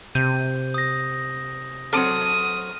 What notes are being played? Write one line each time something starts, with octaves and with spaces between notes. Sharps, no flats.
C3 G6 D#7
D#6 A#6
F#3 C4 A4 D#6 F6 D#7